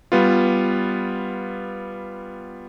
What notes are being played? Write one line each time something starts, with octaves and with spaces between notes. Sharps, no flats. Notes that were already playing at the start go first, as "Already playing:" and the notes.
G3 B3 F4